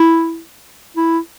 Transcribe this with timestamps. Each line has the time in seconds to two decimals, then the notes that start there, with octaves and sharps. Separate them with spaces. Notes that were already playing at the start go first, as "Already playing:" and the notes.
Already playing: E4
0.97 E4